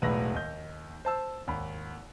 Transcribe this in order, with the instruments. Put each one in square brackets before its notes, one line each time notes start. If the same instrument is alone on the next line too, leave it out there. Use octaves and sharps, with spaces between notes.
[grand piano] E1 B1 A2 B4 A#6
D#2 D#5 G6
C5 A5 E6
G#1 D#2 B5